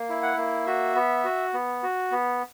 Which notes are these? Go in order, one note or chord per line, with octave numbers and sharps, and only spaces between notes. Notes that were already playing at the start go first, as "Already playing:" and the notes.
Already playing: A#3
E4
F#5
A#3
F#4 E5
B3
F#4
B3
F#4
B3